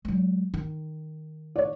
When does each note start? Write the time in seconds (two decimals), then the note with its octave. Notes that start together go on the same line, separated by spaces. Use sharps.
0.05 F#3 G#3
0.54 D#3
1.56 C#5 D5